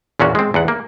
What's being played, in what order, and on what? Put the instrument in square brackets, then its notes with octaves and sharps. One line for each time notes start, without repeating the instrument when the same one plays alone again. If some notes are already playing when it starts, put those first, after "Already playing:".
[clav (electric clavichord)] E2 A#2 C#4 F#4
G#3 C4
E2 F#5
A#3